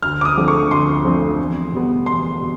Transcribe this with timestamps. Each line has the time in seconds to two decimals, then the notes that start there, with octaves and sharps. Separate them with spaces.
0.03 D2 F6
0.21 D6
0.25 D#6
0.37 D3 F3 A3 C4
0.48 C#6
0.71 D2 C6
1.05 D3 F3 A3 C4
1.38 E2
1.72 B2 G3 B3
2.06 E2 C6
2.40 B2 G3